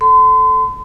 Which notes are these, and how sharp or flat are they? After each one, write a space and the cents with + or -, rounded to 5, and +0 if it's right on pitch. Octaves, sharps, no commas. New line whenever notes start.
A4 +0 C6 -40